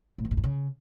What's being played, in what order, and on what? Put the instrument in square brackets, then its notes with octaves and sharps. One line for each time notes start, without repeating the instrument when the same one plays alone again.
[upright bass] A2
E2
A2
G2
C#3